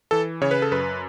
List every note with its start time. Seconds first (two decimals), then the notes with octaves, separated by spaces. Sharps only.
0.11 E3 A4
0.41 C#3 C#5
0.51 B4
0.62 A4
0.72 F#2 B4